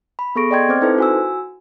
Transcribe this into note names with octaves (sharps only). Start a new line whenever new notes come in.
B5
B3 G#4 A4 C#6 A#6 D7
D5 D#5 G5 C6 G#6 A6
C4 C5 D6 F6
D#4 E4 A4 B4 C5
F#4 G#5 E6